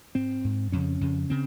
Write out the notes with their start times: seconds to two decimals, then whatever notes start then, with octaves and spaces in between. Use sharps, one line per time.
0.15 G#2 C4
0.44 G#2
0.72 F2 C#3 C#4
1.01 F2 C#3
1.30 C#3 C4